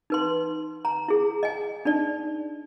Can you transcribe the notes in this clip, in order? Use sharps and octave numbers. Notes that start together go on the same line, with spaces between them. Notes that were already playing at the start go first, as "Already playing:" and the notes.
D#4 B4 C6
A#5
E4 G#4
D#5 G#5
D4 D#4 D5